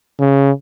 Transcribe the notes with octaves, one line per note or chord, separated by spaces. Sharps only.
C#3